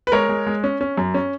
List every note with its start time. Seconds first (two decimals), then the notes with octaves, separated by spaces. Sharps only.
0.07 B4
0.12 G#3 A#4 C#5
0.29 G#3
0.47 G#3
0.64 C#4
0.81 C#4
0.97 F#2
1.14 C#4